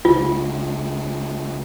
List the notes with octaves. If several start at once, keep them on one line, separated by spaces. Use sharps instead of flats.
C#2 D3 F4